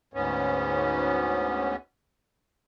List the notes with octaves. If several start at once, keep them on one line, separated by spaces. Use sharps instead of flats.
D2 G#2 B3 C#4